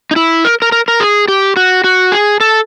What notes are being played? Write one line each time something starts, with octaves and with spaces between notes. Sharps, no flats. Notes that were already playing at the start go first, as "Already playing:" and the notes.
D#4
E4
A#4
A#4
A#4
A#4
G#4
G4
F#4
F#4
G#4
A4